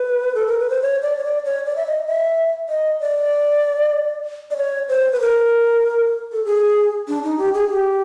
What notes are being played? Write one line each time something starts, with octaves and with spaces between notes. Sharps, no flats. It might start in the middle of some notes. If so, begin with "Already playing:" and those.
Already playing: B4
A4
A#4
B4
C5
C#5
D5
C#5
D5
C#5
D5
E5
D#5
E5
D#5
D5
D5
C#5
C5
B4
A#4
A4
G#4
D4
D#4
G4
G#4
G4